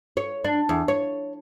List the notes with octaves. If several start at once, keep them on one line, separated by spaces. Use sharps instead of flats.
C#5
D4
E2
C#5